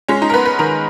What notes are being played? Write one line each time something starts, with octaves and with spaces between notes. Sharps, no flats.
G#3 C#4
D#4
A#4
B3 B4
B4
D#3 A#4